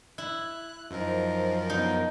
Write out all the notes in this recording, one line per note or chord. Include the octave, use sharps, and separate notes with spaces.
E4 F#6
F#2 F3 D#4 A#4 C5 D#5
B2 D#4